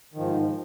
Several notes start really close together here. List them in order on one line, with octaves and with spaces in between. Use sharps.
D#3 F3 G#2